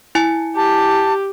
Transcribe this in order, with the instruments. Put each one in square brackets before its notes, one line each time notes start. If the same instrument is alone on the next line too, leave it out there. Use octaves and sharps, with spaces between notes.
[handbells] E4 G#5
[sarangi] G4 [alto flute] A5